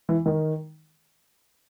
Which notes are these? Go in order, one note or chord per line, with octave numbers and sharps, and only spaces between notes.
E3
D#3